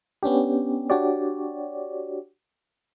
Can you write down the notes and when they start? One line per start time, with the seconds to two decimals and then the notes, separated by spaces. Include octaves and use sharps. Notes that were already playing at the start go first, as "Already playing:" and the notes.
0.23 B3 C#4 D4 G4
0.90 D4 F#4 G4 C#5 D5